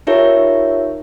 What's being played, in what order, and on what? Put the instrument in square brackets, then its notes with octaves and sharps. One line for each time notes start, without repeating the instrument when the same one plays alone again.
[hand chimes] D#4 F4 G4 A#4 C#5 E5